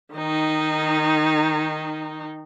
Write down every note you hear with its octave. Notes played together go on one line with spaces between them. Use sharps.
D#3 D#4